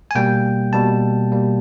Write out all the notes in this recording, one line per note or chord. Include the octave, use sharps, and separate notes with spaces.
G#5
B2 G3 A#3 G5
B2 G3 A#3 A5
B2 G3 A#3